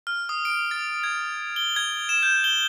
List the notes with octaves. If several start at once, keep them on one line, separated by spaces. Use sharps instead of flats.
F6
D#6
D7
A6
G#6
G7
G#6
E7
G6
G7